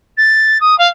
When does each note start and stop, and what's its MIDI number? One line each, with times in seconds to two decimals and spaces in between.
0.17 0.58 93
0.60 0.77 87
0.78 0.87 77